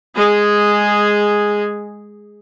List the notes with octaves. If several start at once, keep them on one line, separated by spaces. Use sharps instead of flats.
G#3 G#4